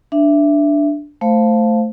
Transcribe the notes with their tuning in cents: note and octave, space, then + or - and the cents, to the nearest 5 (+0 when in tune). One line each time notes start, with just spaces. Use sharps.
D4 +0 E5 +10
A3 +0 C5 +0 F5 +0